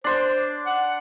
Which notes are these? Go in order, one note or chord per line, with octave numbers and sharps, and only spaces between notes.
D4 C5 C6
F#5